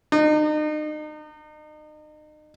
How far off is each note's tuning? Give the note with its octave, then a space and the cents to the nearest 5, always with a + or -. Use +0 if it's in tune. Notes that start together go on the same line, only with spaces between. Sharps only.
D#4 -35